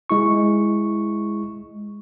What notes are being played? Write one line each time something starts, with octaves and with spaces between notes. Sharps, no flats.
G#3 E4 C#6